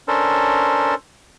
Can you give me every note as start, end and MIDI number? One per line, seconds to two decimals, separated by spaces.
0.08 0.95 61
0.08 0.95 62
0.08 0.95 69
0.08 0.95 70
0.08 0.95 72